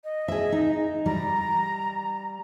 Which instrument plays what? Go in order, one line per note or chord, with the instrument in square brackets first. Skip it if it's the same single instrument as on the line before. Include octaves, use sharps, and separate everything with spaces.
[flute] D#5
[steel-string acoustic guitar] G#4 E5
D#4
[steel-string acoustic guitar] G3 [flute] A#5